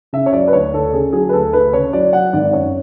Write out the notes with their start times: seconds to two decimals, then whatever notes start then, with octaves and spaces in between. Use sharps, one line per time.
0.13 C#3 E5
0.26 C#5
0.33 F#3 D5
0.47 B4
0.53 D2 C#5
0.73 D2 A4
0.93 C#3 G#4
1.13 F#3 G#4
1.29 B4
1.33 D2 A4
1.53 D2 B4
1.73 C#3 C#5
1.93 F#3 D5
2.13 F#3 F#5
2.33 G#1 D5
2.53 F#2 C#5